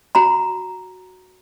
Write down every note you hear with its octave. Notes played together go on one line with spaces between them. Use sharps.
F#4 A#5 B5